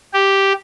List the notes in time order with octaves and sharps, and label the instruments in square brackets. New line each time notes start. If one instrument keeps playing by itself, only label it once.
[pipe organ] G4